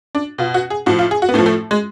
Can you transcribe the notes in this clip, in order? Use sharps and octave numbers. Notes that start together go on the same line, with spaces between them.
D4
B2 F4
F#4
G#4
A2 F3 F#4
F4
G#4
F#4
B3
A2 F3 A3
A3
G#3